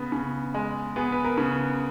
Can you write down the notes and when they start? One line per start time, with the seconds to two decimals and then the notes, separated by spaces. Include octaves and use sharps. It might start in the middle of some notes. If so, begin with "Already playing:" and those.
Already playing: C#3 B3
0.12 C#3
0.54 G#3
0.96 B3 G#4
1.12 B4
1.24 A#4
1.38 C#3